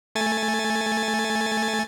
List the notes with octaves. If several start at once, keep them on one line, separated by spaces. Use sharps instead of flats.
A3 G#5 A6